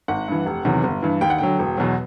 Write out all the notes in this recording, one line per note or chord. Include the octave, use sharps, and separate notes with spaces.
G#1 F#5
G2 E3
F1
E2 C3 D#3 F#3
G1
G2 E3
D#2 G5
F#5
D3 F#3 G5
E1
E2 B2 F#3